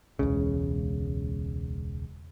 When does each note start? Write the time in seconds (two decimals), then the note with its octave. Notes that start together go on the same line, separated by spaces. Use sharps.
0.19 E1 C#2 C#3